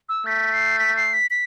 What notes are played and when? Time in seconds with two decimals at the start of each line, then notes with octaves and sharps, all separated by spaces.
0.09 E6
0.26 A3 B6
0.53 C7
0.79 B6
0.97 C7
1.13 B6
1.31 B6